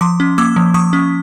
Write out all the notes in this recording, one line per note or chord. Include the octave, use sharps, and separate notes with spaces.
F3 C6 D6
C#4
A#3 D6 E6
F3
F3 C#6 D#6
C#4